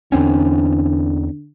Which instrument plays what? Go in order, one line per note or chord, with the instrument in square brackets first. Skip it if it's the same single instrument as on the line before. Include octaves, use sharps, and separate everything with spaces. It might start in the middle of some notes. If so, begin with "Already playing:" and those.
[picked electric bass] E2 C4 C#4 [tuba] D3